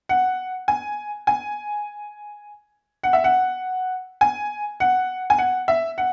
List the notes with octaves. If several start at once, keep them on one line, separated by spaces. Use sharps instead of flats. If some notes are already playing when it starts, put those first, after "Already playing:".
F#5
G#5
G#5
F#5
E5
F#5
G#5
F#5
G#5
F#5
E5
F#5